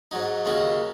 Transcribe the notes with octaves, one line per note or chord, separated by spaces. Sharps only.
G#2 F#3 D#4
D#2 C#3 G#3 D#4 F#4